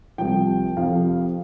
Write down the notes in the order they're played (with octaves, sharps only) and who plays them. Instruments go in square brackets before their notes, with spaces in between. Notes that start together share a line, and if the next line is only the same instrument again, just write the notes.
[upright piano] C2 C3 F3 G5
F2 C3 F3 F5